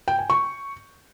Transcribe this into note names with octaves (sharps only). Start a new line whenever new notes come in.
G5
G#5
C#6